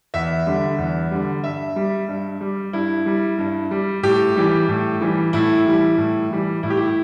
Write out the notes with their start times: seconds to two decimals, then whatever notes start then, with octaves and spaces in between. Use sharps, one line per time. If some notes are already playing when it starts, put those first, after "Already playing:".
0.14 E2 E5
0.46 D3 G3
0.79 E2
1.11 D3 G3
1.44 G2 E5
1.76 G3
2.08 G2
2.41 G3
2.73 G2 E4
3.06 G3
3.38 G2
3.71 G3
4.03 A2 G4
4.36 E3 G3
4.68 A2
5.01 E3 G3
5.33 A2 E4
5.66 E3 G3
5.98 A2
6.31 E3 G3
6.63 A2 E4
6.70 G4
6.77 E4